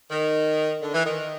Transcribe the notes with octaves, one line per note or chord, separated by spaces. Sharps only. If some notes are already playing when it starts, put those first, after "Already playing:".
D#3
D3
E3
D#3